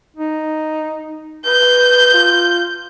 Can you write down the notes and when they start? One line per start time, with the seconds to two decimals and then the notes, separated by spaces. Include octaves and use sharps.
0.17 D#4
1.46 B4 G6
2.14 F4